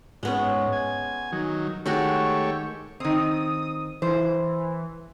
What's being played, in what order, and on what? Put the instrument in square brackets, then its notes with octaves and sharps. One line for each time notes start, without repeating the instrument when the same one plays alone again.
[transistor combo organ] G#2 [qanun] G#3 B3 C#4
[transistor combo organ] G#5
D#3 F#3
[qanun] D#3 G#3 F#4 [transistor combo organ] A3 G4 C#5
[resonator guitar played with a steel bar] D#3 C4 [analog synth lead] D#6
[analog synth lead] E3 [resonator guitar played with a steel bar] C5